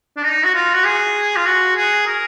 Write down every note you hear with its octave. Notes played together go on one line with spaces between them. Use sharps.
D4
D#4
F#4
F4
F#4
G#4
F4
F#4
G#4
A#4